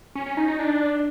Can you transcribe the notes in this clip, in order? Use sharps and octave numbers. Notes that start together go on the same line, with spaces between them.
C#4
C#4
D#4
D#4
D4